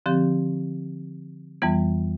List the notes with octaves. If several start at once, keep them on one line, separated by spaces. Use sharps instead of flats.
D3 F3 C4 G4
F2 E3 G3 B3